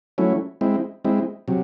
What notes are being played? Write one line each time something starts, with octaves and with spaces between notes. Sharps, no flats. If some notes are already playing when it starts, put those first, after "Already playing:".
F#3 A3 C#4 E4
G#3 C4 E4
G#3 C4 E4
C3 F#3